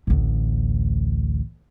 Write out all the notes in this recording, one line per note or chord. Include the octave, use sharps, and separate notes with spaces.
A1 D2